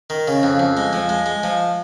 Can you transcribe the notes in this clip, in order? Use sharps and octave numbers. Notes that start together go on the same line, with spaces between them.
D#3
C#3
F2
F2
G#3
F3
G#3
G#3
F3